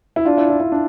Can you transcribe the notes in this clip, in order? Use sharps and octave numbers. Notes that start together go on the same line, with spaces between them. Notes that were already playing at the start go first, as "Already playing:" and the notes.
E4
D4 F4
E4
E4
E4
D4